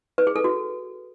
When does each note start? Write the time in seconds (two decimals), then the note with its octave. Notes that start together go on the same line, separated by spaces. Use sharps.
0.18 B4
0.27 G#4
0.36 A4
0.44 F#4